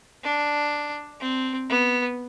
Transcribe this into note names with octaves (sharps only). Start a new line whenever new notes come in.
D4
C4
B3